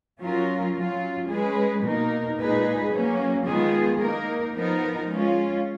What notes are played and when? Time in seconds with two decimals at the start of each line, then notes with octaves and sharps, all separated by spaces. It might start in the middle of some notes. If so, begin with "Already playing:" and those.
0.20 F#3 C#4 F4 A#4
0.74 F#3 C#4 F4
1.29 G#3 C#4 G#4 B4
1.83 B2 A#3 D#4 A#4
2.38 A#2 G#3 D#4 G#4 B4
2.92 F#3 A#3 C#4
3.46 D#3 G#3 B3 F4 G#4
4.01 A#3 D#4 A#4
4.55 F3 B3 D#4 A#4
5.09 G#3 C#4 F4